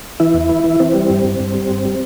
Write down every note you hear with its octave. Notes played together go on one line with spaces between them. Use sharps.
E3 E4
E2
E3
E3
E3 C4
G3
G2
G2
G2
G3
G2
G3